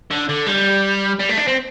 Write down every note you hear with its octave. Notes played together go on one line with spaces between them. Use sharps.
D3
D3
G3
G3
A3
D4
C4